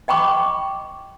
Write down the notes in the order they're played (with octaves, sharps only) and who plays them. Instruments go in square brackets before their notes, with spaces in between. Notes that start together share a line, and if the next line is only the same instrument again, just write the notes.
[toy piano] D#5 G5 B5 C#6 D6